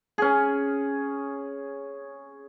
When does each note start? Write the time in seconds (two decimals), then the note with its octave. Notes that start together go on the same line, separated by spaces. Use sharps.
0.18 C#4 G#4